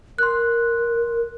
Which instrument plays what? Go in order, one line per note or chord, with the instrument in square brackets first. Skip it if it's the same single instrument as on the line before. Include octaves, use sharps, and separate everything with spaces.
[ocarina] A#4 [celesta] C6 F#6